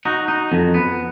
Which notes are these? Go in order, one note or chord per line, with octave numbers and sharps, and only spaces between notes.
D#4 F#4
D#4
F2
B3